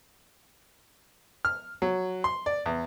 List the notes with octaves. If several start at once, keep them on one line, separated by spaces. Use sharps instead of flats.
F6
F#3
C6
D5
E2